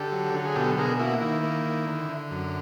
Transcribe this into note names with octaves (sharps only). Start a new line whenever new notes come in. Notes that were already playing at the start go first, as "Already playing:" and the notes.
Already playing: D3 G4 A4
F#3
D3
G#4
B2 G4 A4
B2 G#4 A#4
A#3 E4 F#4
D#3 E4
A#3
D#3
D3
D3
F#2